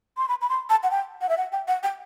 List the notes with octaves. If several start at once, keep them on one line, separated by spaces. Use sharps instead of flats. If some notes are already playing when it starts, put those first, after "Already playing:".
C6
B5
B5
C6
A5
F#5
G5
F#5
E5
F#5
G5
F#5
G5